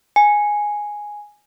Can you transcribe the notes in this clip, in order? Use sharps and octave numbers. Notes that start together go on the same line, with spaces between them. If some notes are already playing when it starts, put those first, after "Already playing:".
G#5